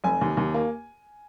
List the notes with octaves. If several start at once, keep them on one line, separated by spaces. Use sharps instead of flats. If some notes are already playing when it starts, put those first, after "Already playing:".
F1 G#5
D#2
D#2
A#3